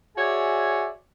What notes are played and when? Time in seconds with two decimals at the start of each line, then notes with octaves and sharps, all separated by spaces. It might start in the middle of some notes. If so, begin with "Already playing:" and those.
0.17 F#4 G#4 C#5 D5 E5 G#5